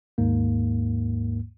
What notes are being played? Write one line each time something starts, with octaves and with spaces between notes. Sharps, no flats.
D#2 G#2 A#3